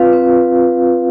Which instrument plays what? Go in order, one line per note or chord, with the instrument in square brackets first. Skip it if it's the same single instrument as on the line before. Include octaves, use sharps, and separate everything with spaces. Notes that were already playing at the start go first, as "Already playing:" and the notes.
Already playing: [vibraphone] C4 F4 B4 F5
C4